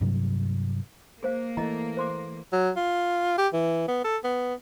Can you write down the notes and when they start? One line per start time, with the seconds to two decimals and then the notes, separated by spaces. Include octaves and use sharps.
0.01 G2 C3 F#3
1.23 A#3 G#4 C5 F5
1.57 E3 A3 G#4 D#5 A#5
1.97 C5 C6 D6
2.52 F#3
2.76 F4
3.38 G4
3.53 E3
3.88 B3
4.04 A4
4.24 B3